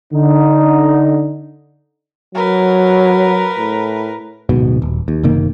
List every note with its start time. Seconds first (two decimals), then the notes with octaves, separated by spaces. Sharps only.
0.13 D3 D#4
2.35 F#3 A#4 B4
3.58 A2
4.49 D1 G#2 B2
4.82 D#1
5.08 D#2
5.23 F#1 C3 D#3 A#3